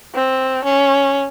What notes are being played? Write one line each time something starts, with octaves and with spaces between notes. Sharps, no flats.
C4
C#4